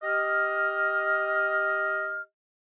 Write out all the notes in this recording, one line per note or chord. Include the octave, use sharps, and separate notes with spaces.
G4 D#5 F6